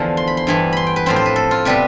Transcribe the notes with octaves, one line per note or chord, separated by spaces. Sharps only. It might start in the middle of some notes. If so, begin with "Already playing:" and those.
Already playing: E2 D3 F3 A3
C6
B5
C6
G2 E3 B3
B5 C6
G5
B4
A2 F3 C4 C5
C5
B4
A4
F4
C3 G3 B3 B4